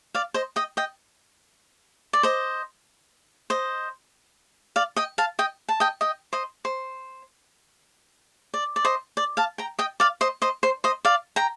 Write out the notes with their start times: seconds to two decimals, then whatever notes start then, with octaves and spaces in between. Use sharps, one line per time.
0.14 D5 F5
0.34 C5 D#5
0.56 D#5 G5
0.77 D#5 G5
2.13 D5
2.23 C5 D#5
3.50 C5 D#5
4.76 D5 F5
4.96 D#5 G5
5.18 F5 A5
5.39 D#5 G5
5.69 A5
5.80 D#5 G5
6.01 D#5 G5
6.33 C5 D#5
6.65 C5
8.54 D5
8.76 D5
8.85 C5 D#5
9.17 D5
9.37 F5 A5
9.58 G5 A#5
9.79 D#5 G5
10.00 D5 F5
10.21 C5 D#5
10.42 C5 D#5
10.63 C5
10.84 C5 D#5
11.05 D5 F5
11.36 G5 A#5